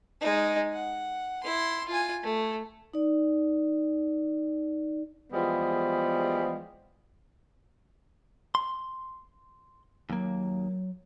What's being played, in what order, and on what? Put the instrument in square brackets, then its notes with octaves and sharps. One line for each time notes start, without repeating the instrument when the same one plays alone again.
[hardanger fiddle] G#3 D#4
F#5
E4 C6
F4 G#5
A3
[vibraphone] D#4 D5
[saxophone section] E2 F3 G3 G#3 B3
[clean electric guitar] C6
[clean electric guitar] D#2 A#3 [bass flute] F#3